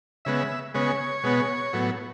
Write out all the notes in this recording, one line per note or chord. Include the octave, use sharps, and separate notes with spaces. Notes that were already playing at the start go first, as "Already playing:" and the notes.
C#3 G#3 B3 E5
C#3 G#3 B3 C#5
B2 G#3 B3
A2 F#3 B3